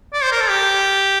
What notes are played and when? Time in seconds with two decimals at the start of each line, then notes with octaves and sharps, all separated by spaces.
0.13 D5
0.23 C5
0.32 A#4
0.41 A4
0.49 G4